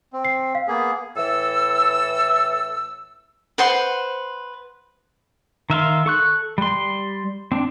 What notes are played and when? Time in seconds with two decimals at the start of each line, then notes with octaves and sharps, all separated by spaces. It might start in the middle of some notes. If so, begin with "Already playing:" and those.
0.13 C4
0.25 C7
0.55 F5
0.68 A#3 B3 G#4
1.16 A2 E3 A4 E6
3.58 B4 C5 F#5 C6
5.70 D#3 E5 F5 C6
6.06 A4 C#6 F#6
6.58 G3 C6
7.52 C4 D4